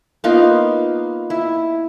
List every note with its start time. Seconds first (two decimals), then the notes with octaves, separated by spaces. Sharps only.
0.24 A#3 B3 D#4 F4
1.30 E4